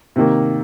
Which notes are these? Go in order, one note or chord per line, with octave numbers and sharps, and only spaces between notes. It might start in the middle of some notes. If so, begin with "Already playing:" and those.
C3 D#3 A#3